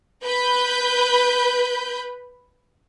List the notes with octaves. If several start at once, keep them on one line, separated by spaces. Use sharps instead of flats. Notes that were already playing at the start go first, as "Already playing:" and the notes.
B4 B5 G6